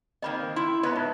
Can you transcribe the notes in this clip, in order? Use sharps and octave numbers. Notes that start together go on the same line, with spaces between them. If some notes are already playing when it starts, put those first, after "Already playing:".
D#3 A#3 C4 D#5 B5
E4 C6
B3 B4 C#5 D#5 E5 B5
G#2 D#4 E5